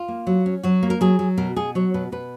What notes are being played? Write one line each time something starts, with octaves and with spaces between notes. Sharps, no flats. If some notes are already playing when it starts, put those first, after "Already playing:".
Already playing: F4
A#3
F#3
C#4
F#3 F#4
A#3
A#4
F#3 G#4
F#3
B2 A#4
B2 G#4
F#3 C#5
B2 B4
B2 B4